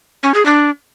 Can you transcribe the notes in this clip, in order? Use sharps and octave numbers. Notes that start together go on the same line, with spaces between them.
C#4
G#4
D4